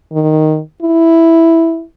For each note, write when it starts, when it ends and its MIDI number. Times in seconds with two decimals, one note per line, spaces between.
0.12 0.60 51
0.83 1.83 64